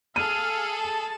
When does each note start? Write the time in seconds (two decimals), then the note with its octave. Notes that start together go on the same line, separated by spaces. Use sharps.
0.16 G#4 A4 F5 D#7
0.74 A5